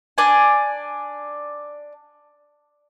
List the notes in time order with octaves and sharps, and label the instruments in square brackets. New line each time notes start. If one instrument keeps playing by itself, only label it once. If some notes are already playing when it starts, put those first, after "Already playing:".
[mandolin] D4 D5 G#5